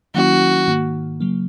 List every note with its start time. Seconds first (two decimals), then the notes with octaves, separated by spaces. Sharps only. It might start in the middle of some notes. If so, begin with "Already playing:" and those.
0.15 D#3 F#3 A#3 C#4 E4 F#4
0.68 G#2 D#3 A#3
1.20 C#3 F#3 A#3